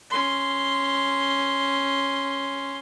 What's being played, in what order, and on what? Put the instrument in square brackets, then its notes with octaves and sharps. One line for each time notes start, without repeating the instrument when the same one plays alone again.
[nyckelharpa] C#4 C6